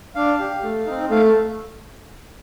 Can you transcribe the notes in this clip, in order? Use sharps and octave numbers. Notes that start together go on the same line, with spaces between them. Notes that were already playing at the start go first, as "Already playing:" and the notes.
D4 F5
G4
A3
C4 D#4
A3 F5